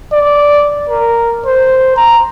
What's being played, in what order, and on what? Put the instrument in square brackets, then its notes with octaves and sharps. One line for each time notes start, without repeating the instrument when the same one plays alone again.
[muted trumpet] D5
A#4
C5
A#5